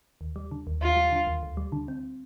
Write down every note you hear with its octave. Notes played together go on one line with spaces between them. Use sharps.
D#2
G3
D3
D#2
D#2 F4
G3
D3
D#2
D2
G3
D3
C4